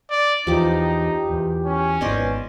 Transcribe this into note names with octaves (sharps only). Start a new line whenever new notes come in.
D5
E2 F3 D#4 G4 D6
E2
C#4
G#1 B3 C5 D5 D#5